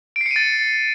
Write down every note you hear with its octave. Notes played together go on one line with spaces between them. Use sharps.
D7
C7
C#7
D#7
A6